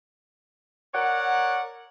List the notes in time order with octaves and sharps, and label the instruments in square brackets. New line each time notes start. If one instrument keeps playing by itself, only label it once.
[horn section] A#4 C#5 D5 F#5